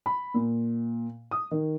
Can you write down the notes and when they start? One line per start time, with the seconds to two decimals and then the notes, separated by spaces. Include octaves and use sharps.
0.06 B5
0.34 A#2
1.31 D#6
1.51 D#3